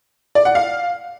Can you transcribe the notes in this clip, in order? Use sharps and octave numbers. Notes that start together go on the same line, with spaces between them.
D5
F#5
F5